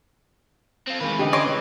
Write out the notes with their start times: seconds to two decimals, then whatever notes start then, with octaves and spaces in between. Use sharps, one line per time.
0.88 C4 F4
1.00 D#3 E3 G#3 B4
1.19 D3 C#4 D4 G4 D#5
1.33 C#5 D#5 C6 D6
1.46 C#2